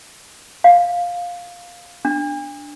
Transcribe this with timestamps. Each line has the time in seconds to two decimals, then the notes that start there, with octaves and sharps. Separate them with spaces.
0.64 F5
2.05 D4